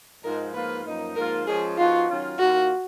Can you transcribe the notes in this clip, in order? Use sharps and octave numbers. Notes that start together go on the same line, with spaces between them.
G#2 F3 G#3 A#4
G#2 F3 A#3 F4 B4
F#2 F3 A#3 D#4
G#2 F3 A#3 F4 A#4
F3 G#3 C#4 G#4
F3 B3 D#4 F4 F#4
D#3 F#3 C#4 F4
D#3 A#3 F4 F#4